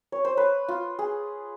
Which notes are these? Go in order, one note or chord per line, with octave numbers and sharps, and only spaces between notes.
C#5
C5
B4
F4
G#4